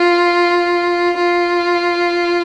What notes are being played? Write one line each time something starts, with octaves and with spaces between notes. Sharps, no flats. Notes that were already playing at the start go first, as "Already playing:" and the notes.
Already playing: F4
F4